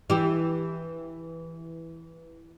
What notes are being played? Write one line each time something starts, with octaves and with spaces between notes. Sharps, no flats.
E3 E4 G4